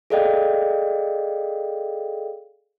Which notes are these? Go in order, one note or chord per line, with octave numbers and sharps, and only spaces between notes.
G#4 A4 D5 D#5 F5 G5